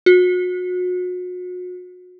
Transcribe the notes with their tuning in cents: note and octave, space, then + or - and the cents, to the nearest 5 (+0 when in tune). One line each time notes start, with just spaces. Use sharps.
F#4 -35